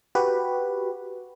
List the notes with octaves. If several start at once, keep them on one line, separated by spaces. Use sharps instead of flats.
F#4 G4 B4